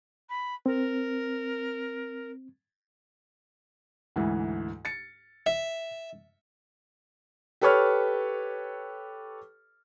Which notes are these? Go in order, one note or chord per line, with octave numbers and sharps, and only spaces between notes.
B5
C4 A#4
D2 G#2 E3
A6 C#7
E5
G4 A4 B4 C#5 C#6 F6